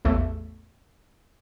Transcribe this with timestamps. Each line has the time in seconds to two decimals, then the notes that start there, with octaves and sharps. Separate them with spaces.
0.05 A1 E2 A3